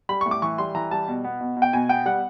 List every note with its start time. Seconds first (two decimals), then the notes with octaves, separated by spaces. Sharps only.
0.09 G3 B5
0.21 C#6
0.26 A2
0.31 D6
0.42 E3 C#6
0.58 G3 C6
0.75 E3 A#5
0.91 G3 A5
1.08 B2
1.24 B3
1.41 B2
1.57 B2
1.62 G5
1.73 B2 G#5
1.89 B3 G5
2.06 G3 F#5